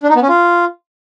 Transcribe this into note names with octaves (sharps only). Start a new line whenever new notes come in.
D4
D#4
B3
C#4
F4